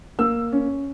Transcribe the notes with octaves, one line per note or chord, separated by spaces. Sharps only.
A#3 E6
C#4